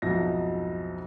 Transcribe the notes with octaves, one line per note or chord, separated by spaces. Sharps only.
B1 F2 G#2 D#4 E5 A#6